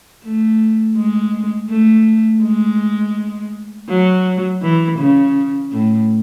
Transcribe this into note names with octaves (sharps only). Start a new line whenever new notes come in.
A3
G#3
A3
G#3
F#3
E3
C#3
A2